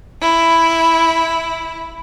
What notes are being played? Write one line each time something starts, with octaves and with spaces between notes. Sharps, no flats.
E4